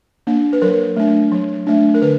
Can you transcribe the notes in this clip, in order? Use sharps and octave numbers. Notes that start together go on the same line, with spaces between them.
A#3 D4
B4
F#3 A#4
A3 D4
F#3
A3 D4
A#4
D3 B4